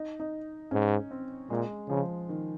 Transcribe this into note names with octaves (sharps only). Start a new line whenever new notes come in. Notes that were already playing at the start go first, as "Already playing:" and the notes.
Already playing: D#4
D#4
G#2 C#4
C4
A#2 G#3
C#3 F3
D#3